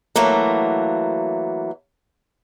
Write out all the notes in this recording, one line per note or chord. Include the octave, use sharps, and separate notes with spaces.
E3 F#3 A3 A#3